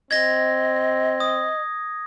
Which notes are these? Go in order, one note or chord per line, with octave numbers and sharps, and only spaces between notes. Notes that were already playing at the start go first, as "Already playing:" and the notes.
C4 D#5 G#6 A#6
D#6